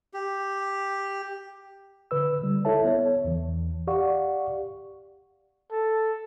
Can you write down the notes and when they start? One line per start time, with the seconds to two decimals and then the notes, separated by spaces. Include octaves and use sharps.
0.13 G4
2.11 D3 B4 E6
2.42 D3 G3
2.65 E4 A4 C#5 E5 A5
2.85 B3 C#5
3.25 E2 E3
3.87 G4 D5 F5 F#5 C#6
5.71 A4